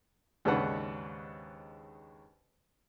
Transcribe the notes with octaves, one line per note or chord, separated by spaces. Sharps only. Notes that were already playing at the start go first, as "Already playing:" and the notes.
D#2 G#2 C#3 D4 B4 F#5